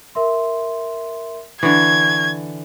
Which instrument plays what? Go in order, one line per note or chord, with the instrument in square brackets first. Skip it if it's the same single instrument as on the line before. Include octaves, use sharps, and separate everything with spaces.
[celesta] A#4 E5 C6
[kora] D3 E3 [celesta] C#6 [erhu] G#6